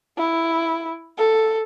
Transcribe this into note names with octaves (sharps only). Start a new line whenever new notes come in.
E4
A4